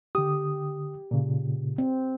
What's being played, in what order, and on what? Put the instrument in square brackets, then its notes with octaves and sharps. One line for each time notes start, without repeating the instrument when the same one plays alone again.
[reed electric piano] D3 D#6 [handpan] G4
[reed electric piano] A#2 C#3
[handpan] C4